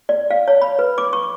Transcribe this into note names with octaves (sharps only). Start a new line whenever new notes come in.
D5
F5
C#5
B5
B4
D6
C#6